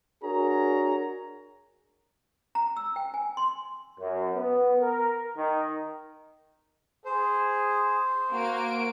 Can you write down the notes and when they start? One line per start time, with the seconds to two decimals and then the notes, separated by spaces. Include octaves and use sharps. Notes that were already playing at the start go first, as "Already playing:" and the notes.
0.23 D4 F#4 G#4 A#4 C#5 A#5
2.55 A#5
2.77 E6
2.96 G5
3.14 G#5
3.37 C6
4.00 F#2
4.35 B3
4.80 A#4
5.37 D#3
7.05 G#4 C5
8.32 A#3 F#4 D7